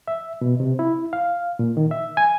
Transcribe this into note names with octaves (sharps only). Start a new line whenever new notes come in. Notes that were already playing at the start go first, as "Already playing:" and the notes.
E5
B2
C3
E4
F5
A#2
D#3
E5
G#5